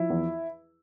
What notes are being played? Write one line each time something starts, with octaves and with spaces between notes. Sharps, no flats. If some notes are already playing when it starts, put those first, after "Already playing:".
Already playing: F3 E4
E2